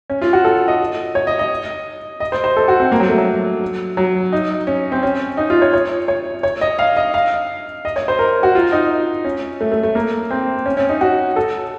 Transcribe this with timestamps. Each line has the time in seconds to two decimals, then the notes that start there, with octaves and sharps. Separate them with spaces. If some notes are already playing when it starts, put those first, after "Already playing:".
0.10 C#4
0.21 F4
0.33 F#4
0.45 A4
0.68 D#5
1.15 C#5
1.27 D#5
1.39 D#5
2.20 D#5
2.32 C5
2.44 C5
2.57 A4
2.68 F#4
2.80 C4
2.92 A#3
3.00 F#3
3.09 A3
3.18 F#3
3.97 F#3
4.33 D#4
4.67 C#4
4.92 C4
5.03 C#4
5.37 D#4
5.50 F4
5.62 C#5
5.73 C#5
6.08 C#5
6.43 C#5
6.61 D#5
6.79 F5
6.97 D#5
7.14 F5
7.85 D#5
7.96 C#5
8.08 C5
8.19 A#4
8.43 F#4
8.55 F4
8.72 D#4
9.24 C#4
9.61 A3
9.72 A3
9.83 A3
9.95 A#3
10.31 C4
10.66 C#4
10.77 C#4
10.89 D#4
11.01 F#4
11.36 A4